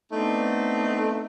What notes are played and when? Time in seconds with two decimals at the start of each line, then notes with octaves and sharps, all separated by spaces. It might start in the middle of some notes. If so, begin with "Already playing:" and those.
0.12 A3 B3 C4 D4 D#4